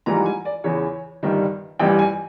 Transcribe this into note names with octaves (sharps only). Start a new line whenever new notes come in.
A#1 G#2 E3 G3 A#5
G#5
D5
E2 C#3 E3 C#5
G1 G2 D#3 G3
A1 G2 E3 G3 G5
G#5